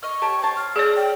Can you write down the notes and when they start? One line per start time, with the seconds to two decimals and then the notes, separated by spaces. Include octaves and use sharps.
0.03 D#5 C#6 F6
0.22 G4 C#5 A5
0.42 C5 C#5 A5
0.57 F6
0.76 G#4 C#5 D5
0.96 G5